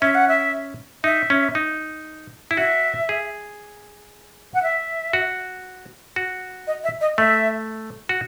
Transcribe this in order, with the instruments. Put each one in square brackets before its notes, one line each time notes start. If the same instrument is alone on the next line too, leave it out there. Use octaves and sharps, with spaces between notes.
[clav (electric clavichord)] C#4 [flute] E5
[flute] F#5
E5
[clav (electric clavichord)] D#4 [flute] E5
[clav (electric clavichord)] C#4
D#4
E4
[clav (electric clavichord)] F#4 [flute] E5
[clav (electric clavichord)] G#4
[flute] F#5
E5
[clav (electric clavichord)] F#4
F#4
[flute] D#5
E5
D#5
[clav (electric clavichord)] A3 [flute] E5
[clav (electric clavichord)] F#4